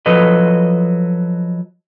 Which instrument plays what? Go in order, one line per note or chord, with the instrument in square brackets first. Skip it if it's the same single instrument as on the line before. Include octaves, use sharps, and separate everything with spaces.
[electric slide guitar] F3 F#3 A4 B4 D#5